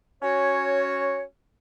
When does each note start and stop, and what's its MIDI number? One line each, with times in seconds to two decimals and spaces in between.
0.22 1.23 61
0.22 1.23 66
0.22 1.23 73